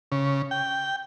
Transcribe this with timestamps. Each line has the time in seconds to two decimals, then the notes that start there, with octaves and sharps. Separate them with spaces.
0.12 C#3
0.51 G5